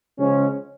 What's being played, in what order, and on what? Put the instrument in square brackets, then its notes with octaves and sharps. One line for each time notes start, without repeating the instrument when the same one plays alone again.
[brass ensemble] C#3 F3 G#3 C#4